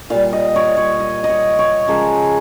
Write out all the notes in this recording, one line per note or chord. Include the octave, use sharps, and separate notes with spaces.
A#2 G3 F5
D#5
C#5
C#5
D#5
D#5
C#5
C#5
C#3 F3 G#3 A#4